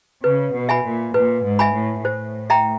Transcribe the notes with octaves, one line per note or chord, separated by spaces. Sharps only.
C#3 B4
B2
E5 G#5 B5
A#2
A#2 B4
G#2
E5 G#5 B5
A2
A2 C5
E5 G5 A#5